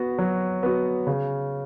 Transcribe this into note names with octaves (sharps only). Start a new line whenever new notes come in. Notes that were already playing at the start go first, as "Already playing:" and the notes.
Already playing: B3 F#4
F#3
B3 F#4
C#3